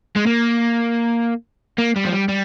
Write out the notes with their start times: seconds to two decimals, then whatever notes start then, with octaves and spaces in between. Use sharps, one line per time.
0.16 G#3
0.27 A#3
1.79 A#3
1.96 G3
2.05 F3
2.12 G3
2.29 G3